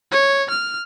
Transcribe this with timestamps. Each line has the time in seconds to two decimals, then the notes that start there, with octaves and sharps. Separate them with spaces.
0.12 C#5
0.50 F6